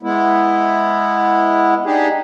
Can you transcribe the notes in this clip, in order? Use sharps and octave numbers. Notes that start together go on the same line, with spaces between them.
G#3 B3 E4
D4 D#4 G4 G#4